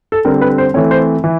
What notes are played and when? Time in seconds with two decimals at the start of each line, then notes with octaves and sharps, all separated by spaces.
0.12 A4
0.25 D3 G3 C4 A#4
0.41 B4
0.58 C5
0.74 E3 A3 C4 C#5
0.91 C5
1.24 E3